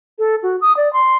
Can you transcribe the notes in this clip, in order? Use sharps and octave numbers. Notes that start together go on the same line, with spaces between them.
A4
F#4
D#6
D5
C6